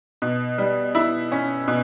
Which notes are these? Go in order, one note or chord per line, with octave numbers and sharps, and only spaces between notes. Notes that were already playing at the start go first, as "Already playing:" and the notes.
B2
G3
E4
C#4
B2